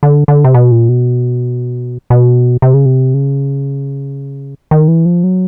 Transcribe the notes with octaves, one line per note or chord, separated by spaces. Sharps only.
D3
D3
C3
B2
A#2
B2
B2
C3
C#3
C3
C#3
D#3
E3
F3
F#3